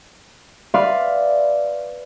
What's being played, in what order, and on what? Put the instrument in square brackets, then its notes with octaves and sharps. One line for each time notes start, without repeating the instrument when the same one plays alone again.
[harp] B4 D5 E5 F5 C6